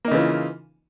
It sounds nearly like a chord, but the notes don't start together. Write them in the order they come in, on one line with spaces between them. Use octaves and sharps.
A#3 D#4 C#3 E3 F4